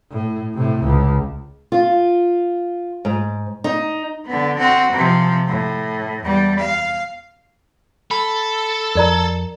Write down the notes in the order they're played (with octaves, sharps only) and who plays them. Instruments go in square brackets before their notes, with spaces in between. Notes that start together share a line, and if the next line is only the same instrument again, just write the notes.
[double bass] A2
A2 C3
C#2
[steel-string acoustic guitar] F4
G#2
D#4
[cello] D3 B3
C4 F#4
C3 F3
A2
E2 G3
F5
[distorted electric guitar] A4 [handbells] B5
[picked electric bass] F2 [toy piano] A#4 D5 A#5